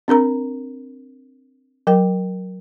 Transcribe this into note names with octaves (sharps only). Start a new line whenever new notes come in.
C4 D4 A#4 A#5
F#3 A#4 G5